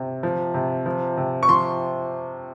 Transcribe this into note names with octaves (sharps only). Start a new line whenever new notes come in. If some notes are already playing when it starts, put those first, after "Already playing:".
Already playing: C3
F3
C3
F3
C3
C#6
F3 C6